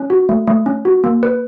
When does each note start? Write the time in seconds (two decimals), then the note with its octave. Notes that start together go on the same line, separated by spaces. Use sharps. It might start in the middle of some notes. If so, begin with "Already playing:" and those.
Already playing: C#4
0.10 F#4
0.29 A3
0.47 A3
0.66 C#4
0.85 F#4
1.04 A#3
1.23 B4